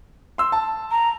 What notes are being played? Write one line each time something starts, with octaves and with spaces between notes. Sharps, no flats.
C6 E6
A5
A#5